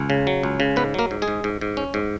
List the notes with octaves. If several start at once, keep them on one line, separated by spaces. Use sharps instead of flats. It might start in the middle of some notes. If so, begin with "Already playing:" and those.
Already playing: C#2
C#3
F#3
C#2
C#3
G#2 B3 B4
F#3 A#3 A#4
G#2
G#3 G#4
G#2
G#2
G#2
C#4
G#2